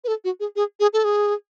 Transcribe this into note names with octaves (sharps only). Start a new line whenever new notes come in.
B4
A4
F#4
G#4
G#4
G#4
A4
G#4